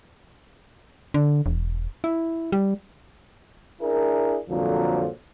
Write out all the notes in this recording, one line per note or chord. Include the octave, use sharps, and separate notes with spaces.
D3
E1
E4
G3
D4 E4 G#4 A#4
C2 F2 A#2 D3 F3 F#3